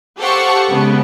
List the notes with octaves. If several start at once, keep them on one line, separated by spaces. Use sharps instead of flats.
G4 A4 C5 F5 F#5 C#6
C#3 G#3 B3